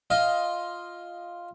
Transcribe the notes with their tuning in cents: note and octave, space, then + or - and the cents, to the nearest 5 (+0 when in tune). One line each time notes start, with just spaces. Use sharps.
F4 +0 D#5 +10